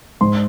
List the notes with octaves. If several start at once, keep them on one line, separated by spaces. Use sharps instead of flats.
G#2 C6